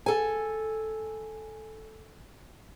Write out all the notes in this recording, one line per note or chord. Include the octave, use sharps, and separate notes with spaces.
A4 G#5